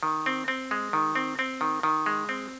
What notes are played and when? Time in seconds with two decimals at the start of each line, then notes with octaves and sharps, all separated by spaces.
0.03 D#3
0.26 C4
0.48 C4
0.71 G#3
0.93 D#3
1.15 C4
1.39 C4
1.61 D#3
1.83 D#3
2.06 G#3
2.29 C4